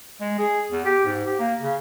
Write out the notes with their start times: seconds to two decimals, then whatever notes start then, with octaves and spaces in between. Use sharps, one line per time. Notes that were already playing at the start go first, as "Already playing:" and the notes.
0.21 G#3
0.39 G#4
0.72 E2
0.85 G4
1.06 G#2
1.26 G4
1.39 A#3
1.61 C#3